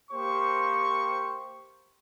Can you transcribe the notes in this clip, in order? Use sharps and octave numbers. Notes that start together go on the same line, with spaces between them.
A#3 G4 C5 C#6